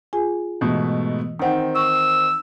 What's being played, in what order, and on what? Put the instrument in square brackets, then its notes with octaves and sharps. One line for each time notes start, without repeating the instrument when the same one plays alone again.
[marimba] F4 G#4 G#5
[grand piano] G#2 B2 A3 [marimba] E3
[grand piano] D#3 C4 [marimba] D#4 F#5 G5
[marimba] C#6 [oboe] E6